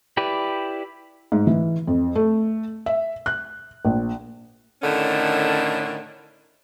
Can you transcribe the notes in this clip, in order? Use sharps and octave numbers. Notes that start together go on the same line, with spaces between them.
E4 G4 B4 D5
G#2
E3
F2
A3
E5
F#6
A#1
A2 D3 D#3 A3 C#4